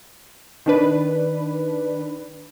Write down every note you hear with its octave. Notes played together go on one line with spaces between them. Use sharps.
D#3 D4 B4